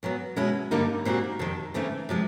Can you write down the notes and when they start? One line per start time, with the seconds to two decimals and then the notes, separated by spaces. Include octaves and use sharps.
0.03 A#2 F#3 B3
0.36 B2 G#3 C#4 E4
0.71 G2 D3 G3 A#3 D#4
1.05 A#2 G3 C4 D#4 F#4
1.39 F2 C3 D#3
1.74 C#3 E3 A3 C4 D#4
2.09 C3 F3 G#3 C4